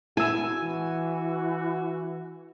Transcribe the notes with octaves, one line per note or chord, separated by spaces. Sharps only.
E4 F#4 G#5 E6
E3 F#4